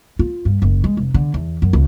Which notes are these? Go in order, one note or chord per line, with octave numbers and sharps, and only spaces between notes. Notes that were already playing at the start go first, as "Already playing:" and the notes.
F4
G2
F#1
G#3
F1
D3
E2
F#2
C#2